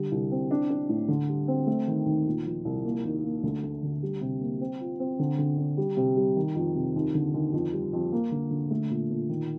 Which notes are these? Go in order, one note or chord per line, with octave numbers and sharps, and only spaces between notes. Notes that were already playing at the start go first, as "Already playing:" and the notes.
Already playing: D3 G3
C2
C4
D4
D4
A2
D3
G3
C4
A3
D#3
D#2
A#2
F3
C2
A#3
D#2
A#3
D2
A3
D3
G3
C3
A#3
C4
F4
C4
D3
D3
D4
G3
C3
G3
D#3
F2
C3
D#2
D3
D#2
F2
G3
F2
A#3
D3
D3
A3
A#2
A#2
D#3